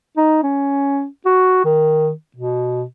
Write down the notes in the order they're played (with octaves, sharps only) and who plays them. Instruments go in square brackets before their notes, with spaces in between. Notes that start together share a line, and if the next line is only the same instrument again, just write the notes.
[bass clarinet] D#4
C#4
F#4
D#3
B2